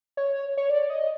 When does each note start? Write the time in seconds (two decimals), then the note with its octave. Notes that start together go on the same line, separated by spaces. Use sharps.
0.17 C#5
0.57 C#5
0.70 D5
0.90 D#5